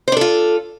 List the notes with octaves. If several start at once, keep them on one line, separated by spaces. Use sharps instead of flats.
D4 F4 A4 C5